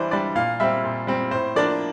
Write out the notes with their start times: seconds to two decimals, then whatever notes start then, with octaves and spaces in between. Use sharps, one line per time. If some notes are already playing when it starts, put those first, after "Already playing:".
Already playing: E3 G3 D4 C5 D5
0.11 G3 D4 D5
0.35 A#2 F5
0.60 G3 C4 E5
0.84 A#2
1.07 G3 C4
1.31 A2 C5
1.56 F3 A#3 D4 D5